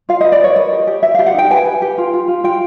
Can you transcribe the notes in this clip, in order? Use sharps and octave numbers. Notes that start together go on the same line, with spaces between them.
F4 F5
B4 D#5
D5
B4 C#5
A#4 D#5
G4
G4
G4 E5
G4 F5
F#5
D#4 G5
B4 G#5
B4
G4
F4
F4
F4
F4 G5